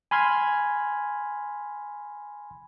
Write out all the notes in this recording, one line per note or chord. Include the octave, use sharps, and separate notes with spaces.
G#5 B5 C6 F6 G#6